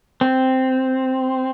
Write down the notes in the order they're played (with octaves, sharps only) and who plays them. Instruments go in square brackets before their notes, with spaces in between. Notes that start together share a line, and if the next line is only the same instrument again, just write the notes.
[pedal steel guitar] C4